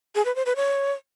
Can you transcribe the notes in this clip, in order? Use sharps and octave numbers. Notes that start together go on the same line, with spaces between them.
G#4
B4
C5
B4
C#5